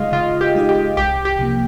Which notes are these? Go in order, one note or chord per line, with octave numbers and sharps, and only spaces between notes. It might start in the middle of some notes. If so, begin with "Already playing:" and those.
Already playing: C#3 G#3 D#4 F4 G#4 D#5
C#3 F4
G4
G#3 D#4 G#4
G4
C2 G4
G4
C3 F3 A#3